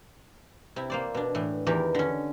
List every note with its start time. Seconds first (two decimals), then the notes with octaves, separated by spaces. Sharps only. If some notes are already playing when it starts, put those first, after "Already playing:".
0.76 C3 E4
0.90 A#3 C5 D5
1.15 B2 D4
1.35 A2 E3
1.67 E2 D#3 E3 G4 A#4
1.95 D3 C#4